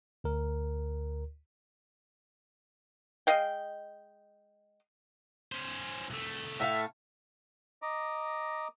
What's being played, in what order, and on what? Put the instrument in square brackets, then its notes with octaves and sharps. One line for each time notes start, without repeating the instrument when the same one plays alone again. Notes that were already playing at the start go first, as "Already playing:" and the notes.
[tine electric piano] D2 A#4
[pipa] G#3 D#5 F5 G5
[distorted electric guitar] C#4 C5
C2 A3
[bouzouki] A2 A3 F5 [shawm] E5
[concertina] D#5 A#5 D6